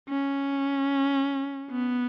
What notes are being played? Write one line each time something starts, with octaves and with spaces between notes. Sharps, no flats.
C#4
B3